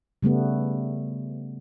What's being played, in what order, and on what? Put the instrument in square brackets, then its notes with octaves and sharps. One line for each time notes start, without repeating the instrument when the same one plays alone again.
[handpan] C#3 G3 A3 B3